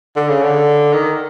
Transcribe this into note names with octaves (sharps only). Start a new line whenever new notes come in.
D3
C#3
D3
D#3